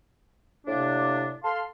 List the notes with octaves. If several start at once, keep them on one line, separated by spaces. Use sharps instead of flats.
A2 C3 A#3 D4
A4 F5 A5 C6